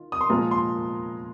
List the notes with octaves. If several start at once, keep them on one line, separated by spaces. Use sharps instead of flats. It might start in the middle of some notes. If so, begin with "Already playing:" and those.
Already playing: D#3 F4
D#6
C6
A#2 F3 G#3 F4 A#5
C6